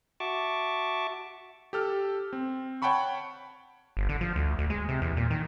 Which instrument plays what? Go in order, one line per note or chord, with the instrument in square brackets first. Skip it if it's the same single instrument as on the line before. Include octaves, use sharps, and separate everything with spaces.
[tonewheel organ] F#4 E5 A5 C#6 D6
[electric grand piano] G4 A4 F6
C4
C#5 F#5 G5 A5 B5 C#6
[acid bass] G1
D3
F3
D2
D2
G#3
C3
E2
A#2
D#3